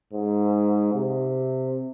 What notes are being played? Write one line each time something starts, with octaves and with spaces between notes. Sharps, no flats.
G#2
C3